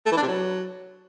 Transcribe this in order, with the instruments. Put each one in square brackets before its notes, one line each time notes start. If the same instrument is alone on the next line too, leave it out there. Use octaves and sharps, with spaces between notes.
[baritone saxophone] A3
E3
D4
C3
F#3